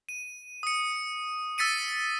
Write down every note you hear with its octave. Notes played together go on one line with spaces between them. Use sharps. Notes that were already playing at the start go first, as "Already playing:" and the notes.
D#7
D#6 C#7
E6 A6 B6 C#7 D#7